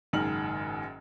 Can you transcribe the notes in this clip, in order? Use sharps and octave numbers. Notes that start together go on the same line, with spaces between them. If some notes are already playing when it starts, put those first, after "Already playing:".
F#1 G#2 D#3 F6 F#7